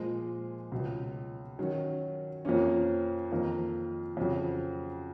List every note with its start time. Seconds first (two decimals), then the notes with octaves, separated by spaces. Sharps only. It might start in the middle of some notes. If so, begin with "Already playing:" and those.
Already playing: A#2 F3 G#3
0.72 C#2 B2 F#3
1.59 D#3 F#3 C#4
2.45 F2 F3 A#3 C#4
3.31 F2 D#3 A#3 D#4 A#4
4.17 F2 C#3 F#3